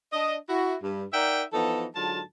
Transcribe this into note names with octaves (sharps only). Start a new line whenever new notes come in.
D4 D#5
E4 F#4
G2
D#4 A#4 D5 E5 F#5 G5
E3 F3 B3 D#4 A4
G#2 D3 F#3 F4 A5